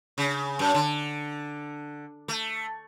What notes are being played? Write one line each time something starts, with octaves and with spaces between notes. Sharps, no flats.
C#3
F#2
D3
A3